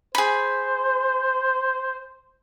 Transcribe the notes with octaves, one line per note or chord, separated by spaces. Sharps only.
G#4 C5 B5